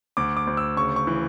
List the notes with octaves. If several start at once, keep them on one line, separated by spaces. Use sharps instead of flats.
D2 D6
D6
D2
E6
C#3 C#6
C#6
E3